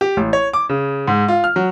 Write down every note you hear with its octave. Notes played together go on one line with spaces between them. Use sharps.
G4
A1
C#5
D6
C#3
G#2
F4
F6
F#3